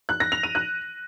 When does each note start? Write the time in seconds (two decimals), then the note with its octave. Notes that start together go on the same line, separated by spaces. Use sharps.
0.09 F#6
0.20 A#6
0.32 F7
0.43 D#7
0.55 F#6